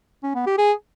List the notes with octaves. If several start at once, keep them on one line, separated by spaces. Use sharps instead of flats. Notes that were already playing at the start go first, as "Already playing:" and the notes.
C#4
B3
G4
G#4